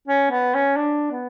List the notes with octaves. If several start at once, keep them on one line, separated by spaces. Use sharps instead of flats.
C#4
B3
C#4
D4
B3